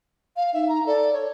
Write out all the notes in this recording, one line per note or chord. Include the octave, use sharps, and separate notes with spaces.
F5
D#4 E5
A#5
A4 D5
C#5